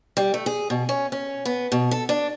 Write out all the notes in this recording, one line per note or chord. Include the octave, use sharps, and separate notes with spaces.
G3
A3
G#4
B2
C#4
C#4
B3
B2
A4
D4